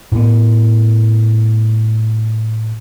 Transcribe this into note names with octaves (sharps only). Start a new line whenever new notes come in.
A2 B3